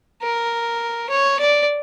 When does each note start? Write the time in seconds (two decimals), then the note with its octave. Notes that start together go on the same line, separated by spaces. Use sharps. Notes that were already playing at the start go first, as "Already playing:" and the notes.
0.23 A#4
1.10 C#5
1.40 D5